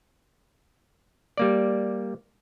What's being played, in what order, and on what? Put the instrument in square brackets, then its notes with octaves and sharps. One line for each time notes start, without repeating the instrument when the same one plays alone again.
[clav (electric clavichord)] G3 A#3 D5